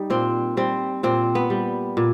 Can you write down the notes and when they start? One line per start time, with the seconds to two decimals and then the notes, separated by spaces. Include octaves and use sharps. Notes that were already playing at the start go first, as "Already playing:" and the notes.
Already playing: G3 D#4
0.10 A#2 C4
0.57 G3 C4
1.03 A#2 C4
1.35 B3
1.50 G3
1.97 A#2